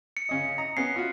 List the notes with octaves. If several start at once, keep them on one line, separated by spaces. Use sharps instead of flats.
C#7
C#3 C#4 D#5
D#5 A#5
B3 C#4 C7
F4 F#4